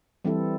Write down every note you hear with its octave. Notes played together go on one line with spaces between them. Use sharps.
E3 G3 C4 E4 A4